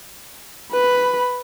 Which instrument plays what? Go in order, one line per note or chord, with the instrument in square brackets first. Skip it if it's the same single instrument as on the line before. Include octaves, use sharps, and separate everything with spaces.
[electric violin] B4 B5